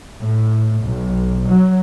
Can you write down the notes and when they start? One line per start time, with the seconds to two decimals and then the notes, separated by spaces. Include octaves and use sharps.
0.20 A2
0.81 B1
1.47 F#3